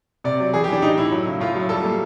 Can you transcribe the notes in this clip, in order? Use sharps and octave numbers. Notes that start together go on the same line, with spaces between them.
C3 D5
F#3
E3 G#4
G4
E3 D4
A2 D#4
A2 E4
F#3
C#3
A2 F4
F#3
G3 A4
A#3